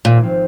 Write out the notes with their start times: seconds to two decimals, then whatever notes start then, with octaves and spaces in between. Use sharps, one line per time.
0.05 G#1 A#2
0.23 F3 C4 F4